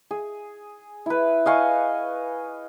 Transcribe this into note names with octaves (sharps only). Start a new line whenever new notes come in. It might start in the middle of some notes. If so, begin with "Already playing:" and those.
G#4
E4 B4
D#5 F5 G#5 C#6